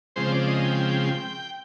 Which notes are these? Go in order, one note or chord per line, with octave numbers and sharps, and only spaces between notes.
C#3 F3 G#3 C4 C5
D5
D#5
G5